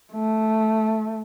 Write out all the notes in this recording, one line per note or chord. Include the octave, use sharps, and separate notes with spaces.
A3